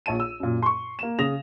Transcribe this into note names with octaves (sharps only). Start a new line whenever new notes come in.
A#1 C#5 A5 D#7
E6
F#2 A#2
C6 C#6
A#3 E7
C#3 D#6 A#6 F7